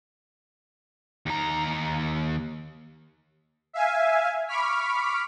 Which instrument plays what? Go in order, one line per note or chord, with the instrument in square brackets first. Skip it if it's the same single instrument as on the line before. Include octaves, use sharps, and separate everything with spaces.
[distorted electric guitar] D#2 A#5
[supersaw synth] E5 F5 G#5
B5 C#6 D6 F6 B6